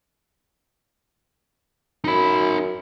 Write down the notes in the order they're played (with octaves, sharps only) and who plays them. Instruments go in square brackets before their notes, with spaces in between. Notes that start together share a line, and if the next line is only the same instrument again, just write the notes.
[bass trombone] F#2 [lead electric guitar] D#4 B5